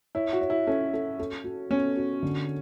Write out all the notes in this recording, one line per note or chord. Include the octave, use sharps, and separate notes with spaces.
E4 C#5
F#4
C#5
E4
C#4 A4
A4
A4
F#4
B3 C#4
F#4
D3